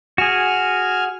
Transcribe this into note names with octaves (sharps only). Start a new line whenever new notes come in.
F#4 G#4 G#5 F6